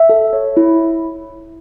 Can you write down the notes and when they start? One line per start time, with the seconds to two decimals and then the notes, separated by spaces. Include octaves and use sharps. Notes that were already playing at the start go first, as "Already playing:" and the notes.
Already playing: E5
0.09 A4
0.33 C#5
0.57 E4